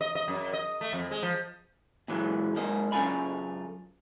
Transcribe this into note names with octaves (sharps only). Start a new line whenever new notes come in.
D#5
D#5
F#2
D#5
A3
F2
G#3
F3
A#2 E3 F#3 G#3
G#2 A#3 D#5
F#2 C#3 F4 A4 G#5 B5